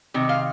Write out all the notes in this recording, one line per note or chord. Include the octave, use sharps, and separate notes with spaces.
C3 D#3
F5